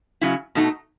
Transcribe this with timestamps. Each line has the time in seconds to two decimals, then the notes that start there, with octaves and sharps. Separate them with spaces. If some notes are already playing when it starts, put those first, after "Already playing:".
0.21 C#3 F#3 C#4 E4
0.55 B2 A3 D#4